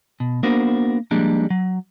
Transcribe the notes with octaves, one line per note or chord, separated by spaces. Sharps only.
B2
A#3 B3 D4 F#4 A#4 C5
F3 G3 G#3 A#3 D4
F#3